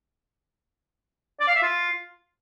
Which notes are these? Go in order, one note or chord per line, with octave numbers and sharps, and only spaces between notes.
D5
F5
E5
F4